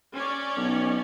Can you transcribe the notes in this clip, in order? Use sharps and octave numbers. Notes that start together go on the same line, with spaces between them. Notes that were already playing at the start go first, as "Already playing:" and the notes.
C#4 C#5 D5
B1